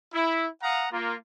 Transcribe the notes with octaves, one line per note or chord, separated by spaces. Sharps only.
E4
F5 F#5 A#5 D#6
A#3 F4